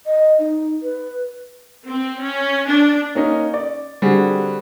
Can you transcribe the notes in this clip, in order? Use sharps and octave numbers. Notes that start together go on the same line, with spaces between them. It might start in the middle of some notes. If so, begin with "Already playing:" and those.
D#5
D#4
B4
C4
C#4
D4
A#3 C#4 D#4
D5
D3 G3 C4 F#4 G#4